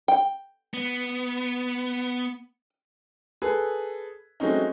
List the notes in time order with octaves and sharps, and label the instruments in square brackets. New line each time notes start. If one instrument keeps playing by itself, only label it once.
[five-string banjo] G5
[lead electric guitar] B3
[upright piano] G#4 A4 B4
F#3 G#3 A3 C4 C#4 D#4